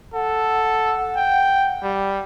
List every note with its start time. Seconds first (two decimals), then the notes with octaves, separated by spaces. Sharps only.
0.14 A4 F#5
1.16 G5
1.83 G3